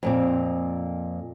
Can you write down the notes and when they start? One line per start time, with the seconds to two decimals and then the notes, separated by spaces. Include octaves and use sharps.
0.03 F2 A#2 C4